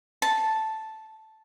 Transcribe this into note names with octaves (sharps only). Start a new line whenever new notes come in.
A5